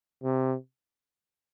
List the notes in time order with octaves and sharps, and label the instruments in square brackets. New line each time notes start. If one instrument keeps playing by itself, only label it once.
[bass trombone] C3